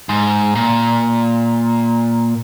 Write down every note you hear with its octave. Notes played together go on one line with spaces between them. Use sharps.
G#2
A#2